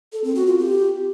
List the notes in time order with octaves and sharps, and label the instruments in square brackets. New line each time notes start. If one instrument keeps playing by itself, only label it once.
[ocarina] A4
C4
F#4
F4
G4